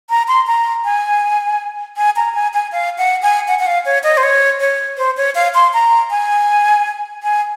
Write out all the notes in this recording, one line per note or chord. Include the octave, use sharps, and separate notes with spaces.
A#5
C6
A#5
G#5
G#5
A#5
G#5
G#5
F5
F#5
G#5
F#5
F#5
F5
C#5
D#5
C5
C#5
C#5
C5
C#5
F5
C6
A#5
G#5
G#5